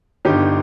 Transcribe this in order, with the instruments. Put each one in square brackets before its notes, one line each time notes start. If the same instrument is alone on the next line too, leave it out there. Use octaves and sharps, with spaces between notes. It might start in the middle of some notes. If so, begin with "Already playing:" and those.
[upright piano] G1 G2 D3 D#4 G4